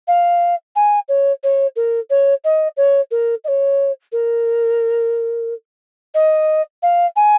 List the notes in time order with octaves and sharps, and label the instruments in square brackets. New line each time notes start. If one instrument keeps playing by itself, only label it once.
[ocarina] F5
G#5
C#5
C#5
A#4
C#5
D#5
C#5
A#4
D#5
C#5
A#4
D#5
F5
G#5